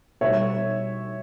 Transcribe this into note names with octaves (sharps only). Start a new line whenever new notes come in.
B2 G3 C#5 E5